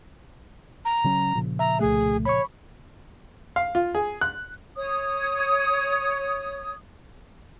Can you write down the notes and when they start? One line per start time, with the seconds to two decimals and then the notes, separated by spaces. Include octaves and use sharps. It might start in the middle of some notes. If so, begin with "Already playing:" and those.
0.85 A#5
1.04 C#3 F#3 C#4
1.35 A#2 C#3 F3
1.59 E5 A#5
1.80 C2 A3 G#4
2.25 C#5 B5 C#6
3.56 F5
3.75 F4
3.95 G#4
4.21 F#6
4.77 C#5 D#6